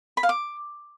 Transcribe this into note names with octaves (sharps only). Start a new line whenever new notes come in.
B5
F5
D6